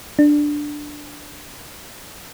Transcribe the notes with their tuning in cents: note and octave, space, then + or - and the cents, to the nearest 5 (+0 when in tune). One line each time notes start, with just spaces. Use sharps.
D4 +5